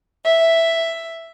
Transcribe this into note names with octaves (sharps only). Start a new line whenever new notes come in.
E5